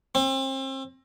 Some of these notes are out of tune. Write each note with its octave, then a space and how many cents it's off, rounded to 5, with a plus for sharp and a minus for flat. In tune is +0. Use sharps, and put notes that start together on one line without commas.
C4 +35